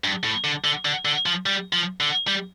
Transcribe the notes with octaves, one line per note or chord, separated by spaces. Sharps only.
G2
A2
D3
D3
D3
D3
F3
G3
F3
D3
G3